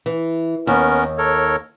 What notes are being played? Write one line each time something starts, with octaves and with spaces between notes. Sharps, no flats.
E3
D#2 B3 C#4 A#4
A4 A#4 C#5